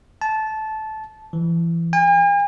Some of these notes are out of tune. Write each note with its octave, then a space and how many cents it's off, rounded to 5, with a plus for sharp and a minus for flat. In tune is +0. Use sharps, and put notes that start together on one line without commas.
A5 -15
E3 +25
G#5 -45